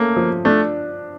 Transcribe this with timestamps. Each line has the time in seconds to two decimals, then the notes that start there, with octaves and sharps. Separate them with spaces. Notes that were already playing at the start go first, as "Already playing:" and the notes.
Already playing: A3 A#3 C#4
0.16 F3
0.45 A3 D4